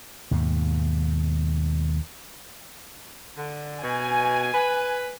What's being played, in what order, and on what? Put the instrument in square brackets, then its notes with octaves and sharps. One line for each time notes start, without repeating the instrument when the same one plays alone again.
[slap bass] D#2 G#2 B2
[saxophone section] D3
[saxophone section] B2 [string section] G#5
[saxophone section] B4